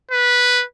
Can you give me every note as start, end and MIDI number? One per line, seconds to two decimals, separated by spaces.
0.11 0.63 71